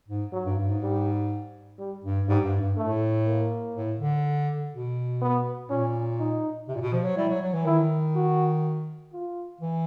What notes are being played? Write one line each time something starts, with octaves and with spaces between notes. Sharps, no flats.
G#2
F#3
G2
G2
G#2
G3
G3
G2
G#2 G3
G2
G2
A2 A3
A#3
A2
D3
B2
B3
A#2 C#4
D#4
C3
A#2
B2
F3
F#3
G3 E4
F#3
F#3
E3
D#3 E4
F#4
F4
E3